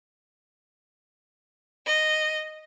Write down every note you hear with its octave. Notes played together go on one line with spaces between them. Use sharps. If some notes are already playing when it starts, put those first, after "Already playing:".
D#5